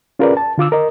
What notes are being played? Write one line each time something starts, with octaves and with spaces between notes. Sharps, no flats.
C#4 F4 G#4 A#4 B4 D5
A5
D3 F4 D6 E6
A#4 D#5